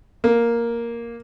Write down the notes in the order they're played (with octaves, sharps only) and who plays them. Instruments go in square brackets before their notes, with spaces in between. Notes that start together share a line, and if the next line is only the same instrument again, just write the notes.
[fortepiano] A#3